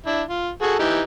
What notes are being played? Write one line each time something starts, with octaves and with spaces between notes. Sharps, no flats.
D4 E4
F4
F#4 G#4 A4
E3 D#4 G4